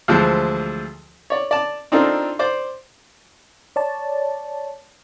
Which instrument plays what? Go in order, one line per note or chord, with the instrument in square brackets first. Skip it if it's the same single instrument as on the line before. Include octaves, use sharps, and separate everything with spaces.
[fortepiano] D2 E3 F3 G#3 C5
C#5 D5
D5 A5
C4 D4 D#4 F4 A4 A#4
C5 D5 D6
[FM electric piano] C#5 D5 A5